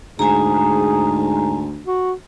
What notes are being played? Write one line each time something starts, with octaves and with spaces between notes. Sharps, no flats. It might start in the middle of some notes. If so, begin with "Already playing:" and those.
D2 G#2 G#4 G#5 A#5
F#4